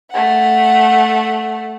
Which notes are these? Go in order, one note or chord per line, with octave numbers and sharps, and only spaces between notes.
A3 F#5